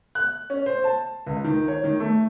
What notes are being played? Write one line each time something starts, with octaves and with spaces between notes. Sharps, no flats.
F#6
C#4
C5
A5
C#2
D#3
C#5
D#3
A3